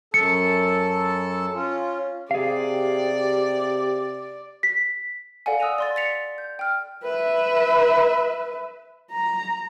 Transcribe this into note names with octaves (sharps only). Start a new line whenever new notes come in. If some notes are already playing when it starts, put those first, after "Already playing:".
F#2 A4 A5 C#7
C#4 F4
C3 G4 G#4 D5 F5
B6
A4 D5 F5 F#5 G#5
D#6 E6 F#6 A#6 D#7 F7
D5 C6 A6
A6 B6 C#7 F7
G6
G5 F6
B4 E5
A#5